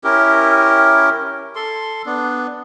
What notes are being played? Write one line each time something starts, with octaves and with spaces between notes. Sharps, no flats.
C#4 E4 G4 A#4
A4 C6
B3 D4